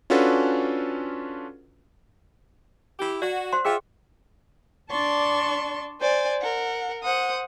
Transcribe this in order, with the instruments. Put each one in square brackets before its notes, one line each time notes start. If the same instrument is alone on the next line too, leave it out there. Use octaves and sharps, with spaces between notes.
[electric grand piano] C#4 D4 F4 F#4 A4 B4
[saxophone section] E4 G4
[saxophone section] F#4 [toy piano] D5 F#5
[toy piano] C5 F#5 C6
[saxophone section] F4 E5 [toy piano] G#4 G5
[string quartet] D4 D5 A5 C6 C#6
C5 D5 G#5
A#4 F#5
C5 F#5 D#6